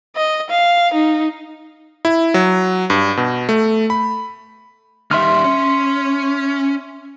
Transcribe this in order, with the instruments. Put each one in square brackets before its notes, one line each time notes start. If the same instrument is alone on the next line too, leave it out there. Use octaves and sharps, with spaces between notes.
[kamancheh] D#5
F5
D#4
[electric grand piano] E4
F#3
G2
B2
A3
B5
[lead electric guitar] D#3 G3 [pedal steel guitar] E5 C6 F6
[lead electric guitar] C#4